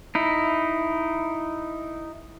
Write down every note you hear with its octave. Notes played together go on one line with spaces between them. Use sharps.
D#4 E4